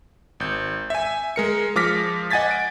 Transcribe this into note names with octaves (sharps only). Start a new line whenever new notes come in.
G#1 G6
E5 G#5
G#3 A#4 C#7
F3 G#3 D6 F6 A#6 B6
D#5 F#5 G#5 G#6 A6 B6
D7